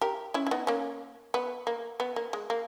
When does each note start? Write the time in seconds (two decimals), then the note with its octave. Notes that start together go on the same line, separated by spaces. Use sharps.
0.01 G4 A#4
0.34 C#4 E4
0.47 E4
0.51 B3 D#4
0.67 A#3 C#4
1.34 B3
1.67 A#3
2.00 B3
2.16 A#3
2.33 G#3
2.50 A#3